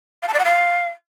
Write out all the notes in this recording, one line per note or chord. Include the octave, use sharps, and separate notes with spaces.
F5
A5
D5
F#5
F5